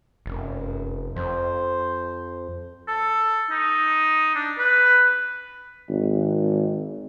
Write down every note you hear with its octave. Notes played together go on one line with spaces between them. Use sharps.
F1 F#2
F2 C5
A4
D#4
D4
B4
G#1